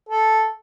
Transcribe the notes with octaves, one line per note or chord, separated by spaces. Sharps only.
A4